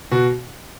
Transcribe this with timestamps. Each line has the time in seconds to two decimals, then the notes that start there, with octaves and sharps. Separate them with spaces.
0.11 B2 F#4